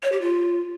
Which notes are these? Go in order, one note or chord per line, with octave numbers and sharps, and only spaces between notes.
C#5
G4
F4